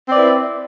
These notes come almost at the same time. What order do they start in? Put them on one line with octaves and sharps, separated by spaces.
C4 D5 B4 E4